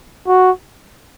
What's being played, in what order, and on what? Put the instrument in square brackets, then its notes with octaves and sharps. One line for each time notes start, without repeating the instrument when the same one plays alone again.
[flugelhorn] F#4